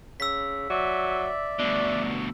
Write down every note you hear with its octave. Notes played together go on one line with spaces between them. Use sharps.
C#3 E6 B6
F#3 D5 E5
D2 B2 D4